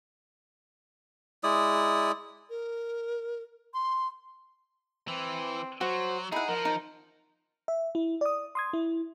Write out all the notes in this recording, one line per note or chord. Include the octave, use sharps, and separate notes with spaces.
G#3 E4 D5 D#6
A#4
C6
E3 C4
F#3 F#4 C5
D#4 E4 G#4 F#5
F3 A#4
D#4
E5
E4
D5 D#6
C6 D#6 G#6
E4